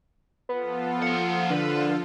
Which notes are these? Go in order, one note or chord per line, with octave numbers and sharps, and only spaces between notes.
F3 B3 F4 A4
A#3 F#5
D3 B4